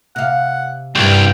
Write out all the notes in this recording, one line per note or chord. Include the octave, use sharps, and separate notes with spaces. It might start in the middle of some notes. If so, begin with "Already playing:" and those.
C3 F5 F#5
C2 G2 G5